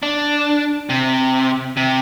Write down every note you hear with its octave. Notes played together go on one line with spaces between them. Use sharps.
D4
C3
C3